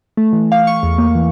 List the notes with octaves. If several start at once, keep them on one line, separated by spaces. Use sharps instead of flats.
A3
E3
F5
C#6
E2
A#3
E3